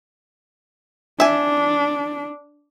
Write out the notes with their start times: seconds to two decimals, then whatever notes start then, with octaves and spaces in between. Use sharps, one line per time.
1.20 D4 E5 G#5